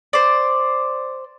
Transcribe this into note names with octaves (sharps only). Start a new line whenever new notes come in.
C5 D5